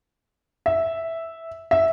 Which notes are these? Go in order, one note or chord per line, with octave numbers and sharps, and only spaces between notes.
E5
E5